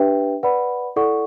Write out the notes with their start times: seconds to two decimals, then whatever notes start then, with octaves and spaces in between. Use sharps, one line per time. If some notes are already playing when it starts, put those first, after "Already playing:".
Already playing: D4 G4 B4 E5 G5
0.43 B4 D5 F#5 B5
0.96 E4 A4 D5 F#5 C#6